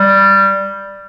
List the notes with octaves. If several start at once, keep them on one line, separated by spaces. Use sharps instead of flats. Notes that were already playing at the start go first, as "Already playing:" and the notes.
Already playing: G3